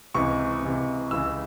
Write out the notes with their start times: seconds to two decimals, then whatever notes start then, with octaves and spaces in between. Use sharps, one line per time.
0.14 C#2 C3 E3 C#6
0.63 C#2 C3 E3
1.11 C#2 C#3 E3 E6